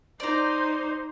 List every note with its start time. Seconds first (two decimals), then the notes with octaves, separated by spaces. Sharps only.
0.20 D#4 C5 D5 A#5